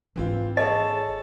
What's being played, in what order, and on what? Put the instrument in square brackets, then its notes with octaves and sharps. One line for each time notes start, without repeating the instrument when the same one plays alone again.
[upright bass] G#1 D4 [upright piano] E3 C4 F4
[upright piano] G#4 A4 C#5 [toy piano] D#5 [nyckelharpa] A5